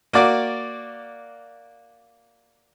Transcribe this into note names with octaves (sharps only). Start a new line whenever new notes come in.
A#3 F#4 D5 D6